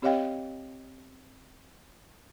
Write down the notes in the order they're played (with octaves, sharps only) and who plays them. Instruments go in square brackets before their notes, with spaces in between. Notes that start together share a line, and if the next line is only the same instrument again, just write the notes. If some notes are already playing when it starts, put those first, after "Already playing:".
[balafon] C4 G4 C#5 D#5 F5 G5